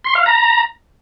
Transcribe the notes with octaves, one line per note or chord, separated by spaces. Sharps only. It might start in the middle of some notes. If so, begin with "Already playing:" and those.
C6
F5
A#5